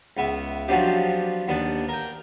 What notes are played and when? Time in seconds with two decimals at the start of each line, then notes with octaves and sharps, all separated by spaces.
0.17 C#2 B3 E5
0.68 F3 F#3 B3 C4 D4 G4
1.48 D#2 B3 D4
1.89 A#4 G5